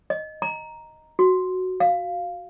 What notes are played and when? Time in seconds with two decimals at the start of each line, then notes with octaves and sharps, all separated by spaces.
0.10 D#5
0.42 A#5
1.19 F#4
1.80 F5